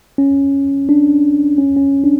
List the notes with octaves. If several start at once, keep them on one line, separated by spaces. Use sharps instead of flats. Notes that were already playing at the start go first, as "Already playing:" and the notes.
C#4
D4
C#4
C#4
D4